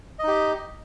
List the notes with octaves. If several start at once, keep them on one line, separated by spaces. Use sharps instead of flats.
D#4 G4 D#5